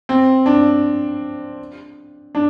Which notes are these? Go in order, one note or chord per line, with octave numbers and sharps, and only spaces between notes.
C4
D4
D4